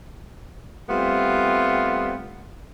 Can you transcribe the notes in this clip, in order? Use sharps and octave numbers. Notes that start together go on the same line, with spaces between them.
G3 A3 B3 C4 F4